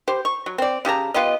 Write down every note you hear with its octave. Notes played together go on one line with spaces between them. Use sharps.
G4 C5
C#6
F#3
C4 D5
C#3 G4 A5 A#5
B3 F4 G4 D#5